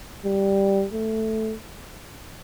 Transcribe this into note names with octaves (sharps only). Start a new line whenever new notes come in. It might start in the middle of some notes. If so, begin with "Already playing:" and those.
G3
A3